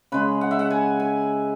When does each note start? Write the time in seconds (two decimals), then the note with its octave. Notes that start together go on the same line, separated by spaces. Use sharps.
0.12 C#3 G#3 B4
0.41 F#5
0.51 E5
0.59 F#5
0.70 G#5
1.00 G#5